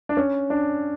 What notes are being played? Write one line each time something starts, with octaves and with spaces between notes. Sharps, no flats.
D4
C#4
D4